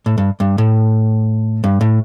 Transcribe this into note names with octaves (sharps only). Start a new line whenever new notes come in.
A2
G2
G2
A2
G2
A2